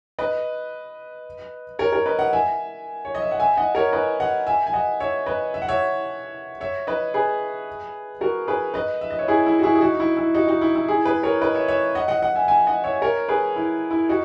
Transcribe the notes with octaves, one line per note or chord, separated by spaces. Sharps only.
B4 D#5
A#4 C#5
A#4 C#5
B4 D#5
D#5 F#5
E5 G#5
C#5
D#5
E5
F#5
E5 G#5
D#5 F#5
A#4 C#5
B4 D#5
D#5 F#5
E5 G#5
G#5
D#5 F#5
C#5 E5
B4 D#5
E5
F#5
C#5 E5
C#5 E5
B4 D#5
G#4 B4
F#4 A#4
G#4 B4
B4 D#5
E5
D#5
C#5 E5
E4 G#4
E4
F#4
E4 G#4
G#4
D#4 F#4
E4
E4
D#4 F#4
D#4 F#4
E4
E4
E4 G#4
G#4 B4
A#4 C#5
B4 D#5
C#5 E5
C#5 E5
D#5 F#5
D#5 F#5
D#5 F#5
E5 G#5
E5 G#5
D#5 F#5
C#5 E5
A#4 C#5
G#4 B4
E4
E4
D#4 F#4